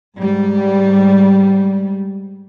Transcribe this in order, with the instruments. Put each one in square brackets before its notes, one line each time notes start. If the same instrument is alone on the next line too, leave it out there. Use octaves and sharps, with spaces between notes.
[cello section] G#2 G3